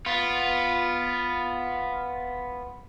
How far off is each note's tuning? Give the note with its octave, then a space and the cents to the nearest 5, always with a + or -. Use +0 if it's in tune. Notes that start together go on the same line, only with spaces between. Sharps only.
B3 +0 F4 +0